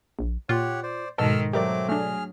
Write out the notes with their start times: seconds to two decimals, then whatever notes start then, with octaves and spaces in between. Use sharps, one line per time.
0.19 A#1
0.49 A#2 F4 G4 C#5 F#5
0.83 C5 D5
1.18 G#2 B2 D#3 A4 E6 F6
1.53 F#3 A3 C4 G4 A#4 D5 D6
1.89 A3 D4 G#4 F6